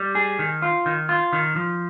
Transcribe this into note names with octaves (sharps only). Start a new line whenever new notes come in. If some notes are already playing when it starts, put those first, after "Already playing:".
Already playing: G3
G#4
D#3
F4
D#3
F4
D#3
F3